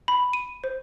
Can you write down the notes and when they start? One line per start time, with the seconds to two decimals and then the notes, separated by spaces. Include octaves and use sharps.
0.08 B5
0.33 D#7
0.64 C5